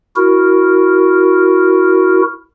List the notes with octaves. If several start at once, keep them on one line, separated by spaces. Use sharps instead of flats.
E4 F#4 A#4